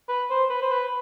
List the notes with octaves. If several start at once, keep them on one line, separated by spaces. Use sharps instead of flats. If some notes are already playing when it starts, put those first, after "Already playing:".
B4
C5
B4
C5
B4